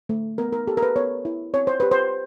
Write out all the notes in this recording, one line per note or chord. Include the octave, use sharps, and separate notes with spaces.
A3
B3 A#4
A#4
G4 A4
A#4
B4
B3 C#5
E4
C4 C#5
C5
G4 B4
C5